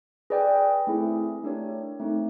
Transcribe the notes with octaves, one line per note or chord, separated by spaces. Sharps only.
G#4 B4 D5 G5
A3 C4 E4 G#4
A3 D4 G4 A#4 C#5
A3 C4 D#4